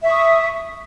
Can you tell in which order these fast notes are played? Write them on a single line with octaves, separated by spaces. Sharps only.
E5 C#6 D#6